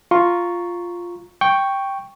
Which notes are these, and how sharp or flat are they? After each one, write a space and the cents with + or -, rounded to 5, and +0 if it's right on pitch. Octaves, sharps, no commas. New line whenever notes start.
F4 +0 A#5 +0 C#6 +0
G5 +0 C#6 +0